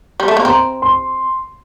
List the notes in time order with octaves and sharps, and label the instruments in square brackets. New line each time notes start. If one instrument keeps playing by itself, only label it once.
[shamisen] G3
A3
A#3
[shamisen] C4 [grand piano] A#5
[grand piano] C6